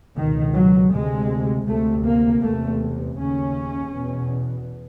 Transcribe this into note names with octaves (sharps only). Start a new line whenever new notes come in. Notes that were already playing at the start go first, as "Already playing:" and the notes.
C#2 B2 D#3
F#3
D2 C3 G#3
D2 C3 A3
A#3
E2 C3 A3
D#2 C#3 C#4
E2 B2